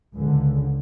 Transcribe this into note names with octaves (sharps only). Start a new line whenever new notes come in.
C#2 D3